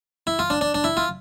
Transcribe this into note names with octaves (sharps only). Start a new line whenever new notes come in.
E4
F4
D4
D4
D4
E4
F4